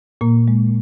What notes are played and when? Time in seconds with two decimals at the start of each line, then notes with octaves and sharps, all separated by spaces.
0.21 A#2 A#3
0.48 G#3